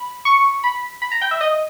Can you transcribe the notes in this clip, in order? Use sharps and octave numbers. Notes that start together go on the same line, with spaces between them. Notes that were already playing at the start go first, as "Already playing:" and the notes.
Already playing: B5
C#6
B5
B5
A#5
G5
E5
D#5